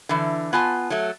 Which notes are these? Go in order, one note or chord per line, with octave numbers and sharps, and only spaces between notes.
D3 E3
B3 F4 G#5 A5
F#3 A3